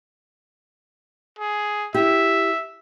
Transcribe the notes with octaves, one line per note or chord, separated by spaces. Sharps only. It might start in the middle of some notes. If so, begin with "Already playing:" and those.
G#4
E4 G4 E5